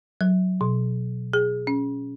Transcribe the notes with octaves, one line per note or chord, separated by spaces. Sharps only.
F#3
B2
G#4
C#4